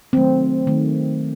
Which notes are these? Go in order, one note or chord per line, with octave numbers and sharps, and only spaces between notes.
D#3 F#3 A3 C4
D#3 A3